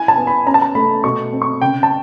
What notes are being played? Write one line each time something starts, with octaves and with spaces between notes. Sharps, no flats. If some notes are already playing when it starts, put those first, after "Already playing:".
Already playing: E4 G#5
A5
B3
B5
C#4 A#5
A5
A#5
A3 B5
B2 C#6
C4
C#6
C#3 G5
A5